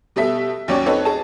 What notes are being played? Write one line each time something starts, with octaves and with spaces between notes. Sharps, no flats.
B2 G3 A4 E5 B6
D#2 F#3 C#4 G4 D5 C#6
C4 D#4 A4 B4 C#5
G#4 A5